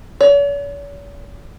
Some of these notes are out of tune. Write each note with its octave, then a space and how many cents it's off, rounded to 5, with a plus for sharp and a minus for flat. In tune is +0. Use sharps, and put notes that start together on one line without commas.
C#5 +45